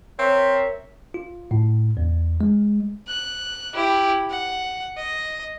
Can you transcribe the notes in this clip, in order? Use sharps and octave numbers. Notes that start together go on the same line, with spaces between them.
C4 A#4 C#5 E5
F4
A2
E2
G#3
F#6
E4 G4
F#5
D#5